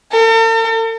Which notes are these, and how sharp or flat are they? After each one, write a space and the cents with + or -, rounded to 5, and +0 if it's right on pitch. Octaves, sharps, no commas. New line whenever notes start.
A4 +45